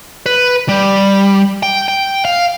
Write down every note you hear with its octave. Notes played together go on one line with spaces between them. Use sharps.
B4
G3
G5
G5
F5